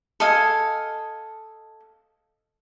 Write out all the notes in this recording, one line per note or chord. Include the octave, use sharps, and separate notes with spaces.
A4 D#5 F5 G#5